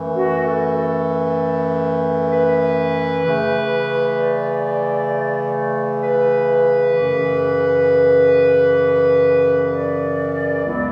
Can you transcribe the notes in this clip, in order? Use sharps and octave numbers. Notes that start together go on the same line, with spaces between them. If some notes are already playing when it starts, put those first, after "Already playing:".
Already playing: F#2 E3 A3
F#4
A4
B4
C#3 E3 A3
D5
B4
F#2 C#3 E3
D5
C#2 C#3 F#3 B3 E4